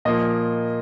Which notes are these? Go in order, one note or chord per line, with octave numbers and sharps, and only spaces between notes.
A#2 F3 A#3 D#5